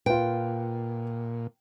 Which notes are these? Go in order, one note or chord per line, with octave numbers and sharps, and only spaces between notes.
A#2 F4 B4 G5